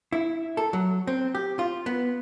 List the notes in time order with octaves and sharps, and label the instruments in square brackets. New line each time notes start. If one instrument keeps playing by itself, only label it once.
[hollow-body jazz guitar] E4
A4
F#3
C4
G4
F4
B3